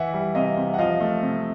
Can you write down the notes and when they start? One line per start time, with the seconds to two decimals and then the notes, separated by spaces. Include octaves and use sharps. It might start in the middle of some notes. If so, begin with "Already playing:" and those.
Already playing: E3 E5 F#5
0.14 G3
0.35 C3 D#5 F5
0.57 C3
0.74 F#5
0.78 F3 D#5 F5
1.00 A3
1.22 C3